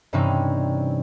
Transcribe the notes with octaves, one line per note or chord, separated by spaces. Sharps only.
G2 C3 E3 C4 C#4 D#4